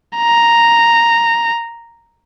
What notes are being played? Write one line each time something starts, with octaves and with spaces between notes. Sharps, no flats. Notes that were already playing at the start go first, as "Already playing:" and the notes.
A#5